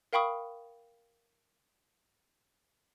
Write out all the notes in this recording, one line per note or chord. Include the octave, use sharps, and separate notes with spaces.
A#4 F5 G5 B5 C#6 D#6